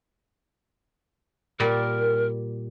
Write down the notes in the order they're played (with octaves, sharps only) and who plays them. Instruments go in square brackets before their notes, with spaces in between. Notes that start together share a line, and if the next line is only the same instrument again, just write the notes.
[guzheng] A#2 G3 D5 [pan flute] A#4